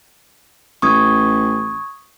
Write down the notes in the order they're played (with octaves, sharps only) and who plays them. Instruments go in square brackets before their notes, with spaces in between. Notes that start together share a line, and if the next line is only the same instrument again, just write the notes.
[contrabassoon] A1 [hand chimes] C#6 D#6 G#6